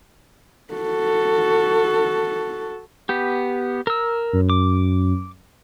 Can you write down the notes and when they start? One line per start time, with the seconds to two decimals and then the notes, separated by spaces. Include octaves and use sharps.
0.73 F#4 A4
3.09 B3 G4
3.87 A#4 E6
4.33 F#2
4.50 D6